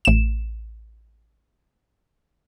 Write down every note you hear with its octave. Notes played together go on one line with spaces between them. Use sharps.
A1 E7